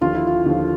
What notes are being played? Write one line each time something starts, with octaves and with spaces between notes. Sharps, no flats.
D#2 D3 F3 F4
E4
F4
D#2 D3 F3